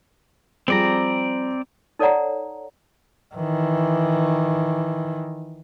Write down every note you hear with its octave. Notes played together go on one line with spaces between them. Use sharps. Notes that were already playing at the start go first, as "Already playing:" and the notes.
F3 G3 C4 G#4 D5 A#5
D#4 A4 C#5 D5 F#5 A#5
D#3 E3